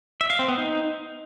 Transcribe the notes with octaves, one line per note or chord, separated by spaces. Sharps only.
E5
F5
C4
B3
D#4